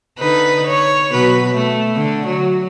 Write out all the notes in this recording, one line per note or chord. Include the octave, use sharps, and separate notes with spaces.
D3 D#4 B4
C#5
B2 F#3 B4
A3
D3
F#3